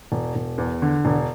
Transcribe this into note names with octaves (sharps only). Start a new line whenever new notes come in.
E1
E1
E2
D3
E1